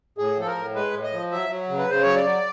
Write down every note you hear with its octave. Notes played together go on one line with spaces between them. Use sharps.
A2 G#4
F3 A4
A#4
A2
G#3 B4
A2
D#5
F3
F#3 E5
F#3
C#3
B4
C#3 C5
F#3 C#5
D5
F#3